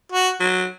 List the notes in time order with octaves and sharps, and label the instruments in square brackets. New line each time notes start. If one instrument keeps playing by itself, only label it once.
[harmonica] F#4
[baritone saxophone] F#3